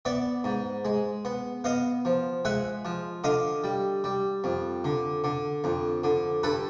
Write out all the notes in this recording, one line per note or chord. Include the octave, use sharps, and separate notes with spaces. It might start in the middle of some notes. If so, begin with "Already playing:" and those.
B3 D5 E5
G#2
G#3
B3
B3 D#5 F5
F3
G#3 E5 F#5
F3
D3 D#5 F5
G3
G3
F2
D3
D3
F2
D3
G2 A4 B4